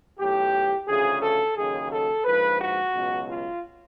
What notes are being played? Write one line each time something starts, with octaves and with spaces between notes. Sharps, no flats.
B1 A2 E3 G4
D2 C#3 F3 G#4
A4
D#2 C#3 F#3 G#4
A4
A#1 G#2 F3 B4
F#4
C#2 B2 F#3
F4